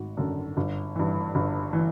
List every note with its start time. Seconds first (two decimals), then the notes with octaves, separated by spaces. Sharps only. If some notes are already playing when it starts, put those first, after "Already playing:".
Already playing: G#1 F#4
0.17 F#2 D3
0.57 G1
0.96 G2 E3
1.35 G1
1.73 E3